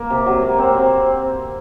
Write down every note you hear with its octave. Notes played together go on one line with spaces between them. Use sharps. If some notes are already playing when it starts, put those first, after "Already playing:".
Already playing: A#3
C3
F#3
A#3
C4
C4